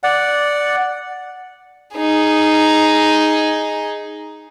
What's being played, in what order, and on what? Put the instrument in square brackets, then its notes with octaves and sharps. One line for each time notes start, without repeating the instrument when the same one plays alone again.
[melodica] D5 F#5
[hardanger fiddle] D#4 G#4